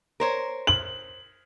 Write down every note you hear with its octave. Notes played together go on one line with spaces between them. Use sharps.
A#4 C5 C#5
F#7